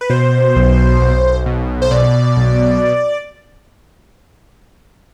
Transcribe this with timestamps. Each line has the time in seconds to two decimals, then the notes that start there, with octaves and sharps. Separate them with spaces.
0.01 B4
0.10 B2 C5
0.56 B1
1.01 B1
1.46 B2
1.82 C5
1.91 B2 D5
2.37 B1